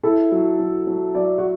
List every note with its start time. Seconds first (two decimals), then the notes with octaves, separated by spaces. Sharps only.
0.03 E4 A4
0.32 F#3
0.59 F#3
0.87 F#3
1.15 F#3 D5
1.38 F#4